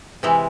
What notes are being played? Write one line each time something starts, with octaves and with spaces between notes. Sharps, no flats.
C3 E3 G#3